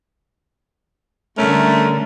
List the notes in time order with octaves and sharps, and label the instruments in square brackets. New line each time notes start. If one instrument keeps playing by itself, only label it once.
[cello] D3 G3 [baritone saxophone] A3 [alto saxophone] C#4 [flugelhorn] A#4